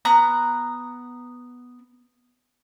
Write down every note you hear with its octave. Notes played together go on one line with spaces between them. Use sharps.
B3 A#5 F#6